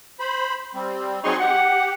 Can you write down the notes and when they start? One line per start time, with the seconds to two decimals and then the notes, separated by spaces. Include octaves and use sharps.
0.20 C5 B5
0.75 G3 C4
1.24 F#3 C4 D#4 G#4 C6 C#6
1.40 G4 F#5